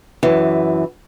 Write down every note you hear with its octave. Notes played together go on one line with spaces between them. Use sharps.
F#2 E3